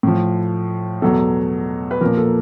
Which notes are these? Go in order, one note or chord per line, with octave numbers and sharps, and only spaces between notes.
A2 F3
E2 B2 F#3 A4
B4
A#2 F3 A#4
A4